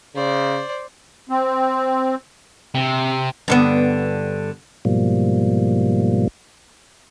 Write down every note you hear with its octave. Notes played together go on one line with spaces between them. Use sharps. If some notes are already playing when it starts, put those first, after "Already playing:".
C#3 C5 D5
C4
C3
G2 D3 B3
G#2 B2 F3 G3 A#3